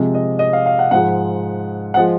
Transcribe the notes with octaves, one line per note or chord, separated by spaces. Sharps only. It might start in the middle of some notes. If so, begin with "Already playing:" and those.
Already playing: C3 F3 G#3
D#5
D#5
F5
F5
F#5
G#2 F3 G#3 F#5
F3 G#3 F#5